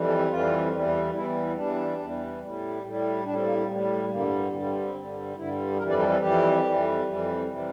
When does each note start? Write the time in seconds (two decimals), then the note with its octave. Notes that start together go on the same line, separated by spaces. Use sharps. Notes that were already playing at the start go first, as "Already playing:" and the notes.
Already playing: F2 E3 G3
0.08 A4
0.19 G4
0.29 F2 E3 G3 F4
0.71 E2 E3 G3
1.13 E2 E3 G3 E4
1.56 E2 E3 G3 D4
1.98 E2 E3 G3
2.40 A2 G3
2.83 A2 G3
3.25 A2 G3 D4
3.35 C4
3.44 A#3
3.55 C4
3.67 A2 G3
3.95 A3
4.10 G2 D3 G3 A#3
4.52 G2 D3 G3 C4
4.66 A#3
4.80 C4
4.94 G2 D3 G3
5.36 G2 D3 G3 E4
5.78 F2 E3 G3 A#4
5.89 D5
5.99 A4
6.10 A4
6.21 F2 E3 G3 G4
6.64 F2 E3 G3
7.06 F2 E3 G3
7.47 C3 E3 G3